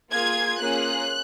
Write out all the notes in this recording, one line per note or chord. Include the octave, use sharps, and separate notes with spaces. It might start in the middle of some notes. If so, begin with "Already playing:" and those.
A#3 F4 G#4 G#6
A#3 C#4 F4 G#4 F#6